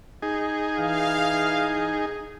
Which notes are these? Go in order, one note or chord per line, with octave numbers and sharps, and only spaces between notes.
D#4 G#4
E3 F5